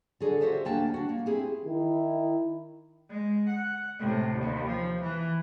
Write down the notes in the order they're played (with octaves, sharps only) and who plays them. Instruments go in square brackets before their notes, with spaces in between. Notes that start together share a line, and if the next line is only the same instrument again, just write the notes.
[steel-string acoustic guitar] D3 F#4 G#4 A4 D5
F#4 G4 C5 E5 F5
D2 A#3 C#4 D4 G5 A5
D4 F#4
A#3
C4 E4 G4 G#4
[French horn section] D#3 E4
[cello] G#3
F#5
A2 C3
D#2
F3
E3